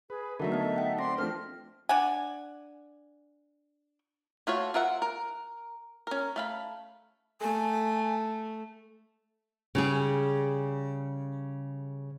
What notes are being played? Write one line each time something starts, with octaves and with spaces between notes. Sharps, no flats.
G#4 B4
D3 F#3 A3 D#4 A4 A#4 E5
B3 D#5
F#5 G5
C4 D5 C6 A#6
F3 A3 C4 D4 F6
D4 F#5 G#5
A3 F4 F#4 C#5
F4 A#4 E5 F#5
A#4
C#4 A#4
A3 F5 B5
A3 G#5
C#3 G3 G#4